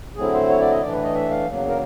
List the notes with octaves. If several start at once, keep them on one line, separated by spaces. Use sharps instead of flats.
D3 F#3 A3 C4 E4 G#4
C5
C#5
D5
D#5
A2 E3 A3 D4 D5
B4
D#5
E5
F5
E2 C#3 F#3 A#3
A#4